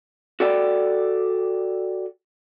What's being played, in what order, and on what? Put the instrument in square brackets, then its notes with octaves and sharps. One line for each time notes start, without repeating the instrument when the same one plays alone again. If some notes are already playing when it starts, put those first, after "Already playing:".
[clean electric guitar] F#4 A4 D5 G5